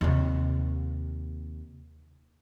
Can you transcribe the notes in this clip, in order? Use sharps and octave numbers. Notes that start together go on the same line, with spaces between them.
D#2 C3